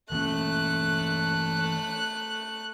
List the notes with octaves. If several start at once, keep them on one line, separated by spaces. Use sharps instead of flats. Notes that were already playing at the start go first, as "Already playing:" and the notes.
E3 A3 A#3 C#4 F#6